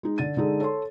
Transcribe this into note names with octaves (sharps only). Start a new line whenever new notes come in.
G#3 D#4
D3 A6 D#7
D3 G#3 D#4 G#4 A4
A4 C#5 C6